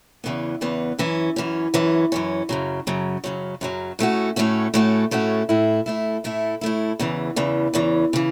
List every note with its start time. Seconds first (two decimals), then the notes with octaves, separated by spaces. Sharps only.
0.24 E2 C#3 E3 B3
0.61 E2 C#3 E3 B3
0.99 F#2 E3 C#4
1.36 F#2 E3 C#4
1.74 F#2 E3 C#4
2.12 F#2 E3 C#4
2.49 F#2 C#3 F#3
2.87 F#2 C#3 F#3
3.24 F#2 C#3 F#3
3.61 F#2 C#3 F#3
3.99 A2 A3 C#4 F#4
4.36 A2 A3 C#4 F#4
4.74 A2 A3 C#4 F#4
5.11 A2 A3 C#4 F#4
5.49 A2 A3 E4
5.86 A2 A3 E4
6.24 A2 A3 E4
6.61 A2 A3 E4
6.99 E2 C#3 E3
7.36 E2 C#3 E3
7.74 E2 C#3 E3
8.13 C#3 E3